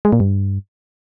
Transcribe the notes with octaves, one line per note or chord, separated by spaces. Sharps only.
G#3
A#2
G2